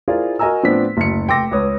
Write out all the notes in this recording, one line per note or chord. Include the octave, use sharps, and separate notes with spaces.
E4 F4 G#4 A#4 C5 D5
F#4 A#4 D#5 G#5 A#5 E6
A2 F3 B3 C4 D4 B6
F#1 D2 C#7
F1 G5 C6 D6 E6 A#6
C#2 B4 C#5 D#6